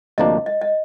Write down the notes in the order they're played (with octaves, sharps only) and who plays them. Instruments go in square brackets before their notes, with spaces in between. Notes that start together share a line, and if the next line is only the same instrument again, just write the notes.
[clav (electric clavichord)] D2 C3 F3 A#3 D4 [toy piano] D#5
[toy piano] D#5
D#5